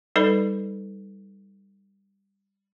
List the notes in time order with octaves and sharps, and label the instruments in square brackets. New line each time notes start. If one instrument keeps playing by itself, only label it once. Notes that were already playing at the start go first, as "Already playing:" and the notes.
[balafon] G3 D#4 A4 B4 D5 B5